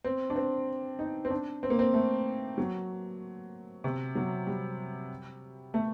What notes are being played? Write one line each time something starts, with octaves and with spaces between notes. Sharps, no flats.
C4
D4
C4
D#4
C4
D4
C4
A#3
C4
A3
F#3
C3
F#3
G3
A3